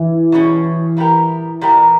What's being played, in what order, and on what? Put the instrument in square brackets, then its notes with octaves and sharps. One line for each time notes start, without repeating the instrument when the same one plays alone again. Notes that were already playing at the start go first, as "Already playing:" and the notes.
Already playing: [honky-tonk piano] E3
[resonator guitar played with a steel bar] B2 G3 C#4 G#4
A#2 G3 B3 G4 A#4
A#2 G3 B3 G4 A#4